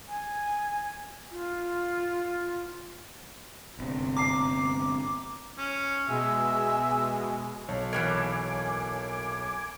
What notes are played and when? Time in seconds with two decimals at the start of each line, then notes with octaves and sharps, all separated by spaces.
0.08 G#5
1.31 F4
3.79 G1 C3
4.17 A#5 D6 C7
5.58 C#4
6.08 B2 G#3 E5 G#5
7.68 B1 C#5 A5
7.93 E3 G#3 A#3 G#5 D6